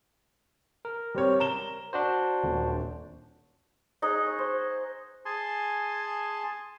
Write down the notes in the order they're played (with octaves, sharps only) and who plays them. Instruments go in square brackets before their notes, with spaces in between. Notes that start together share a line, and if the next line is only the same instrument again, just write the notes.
[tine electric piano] A#4
[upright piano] G3 C4 C#5
A#5 E7 G7
[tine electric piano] D4 F#4 C5
[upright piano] D#1
[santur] D#4 G#4 D#5 F#5
C#5
C5
[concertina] G#4 G#5 A5 C6